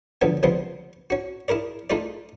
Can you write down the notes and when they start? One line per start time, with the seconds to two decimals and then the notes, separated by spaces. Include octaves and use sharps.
0.22 C#2 D3 F3 F#3 B3
0.43 C#2 F3 G3 B3 C4
1.10 C#4 F#4
1.48 E4 G#4 A#4 D5
1.90 A3 D#4 F4 G#4 D5